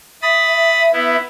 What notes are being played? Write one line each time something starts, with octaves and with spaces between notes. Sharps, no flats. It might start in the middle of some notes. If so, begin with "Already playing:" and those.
E5 B5 D#6 A6
B3 E4